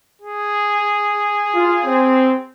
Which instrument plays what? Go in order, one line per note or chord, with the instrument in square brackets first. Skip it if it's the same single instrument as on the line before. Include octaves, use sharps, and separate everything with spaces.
[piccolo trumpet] G#4
[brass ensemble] F4
C4